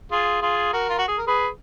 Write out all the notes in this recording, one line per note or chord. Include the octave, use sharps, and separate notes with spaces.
F4 G#4
F4 G#4
F#4 A#4
F4
F#4
G#4
A#4
G#4 B4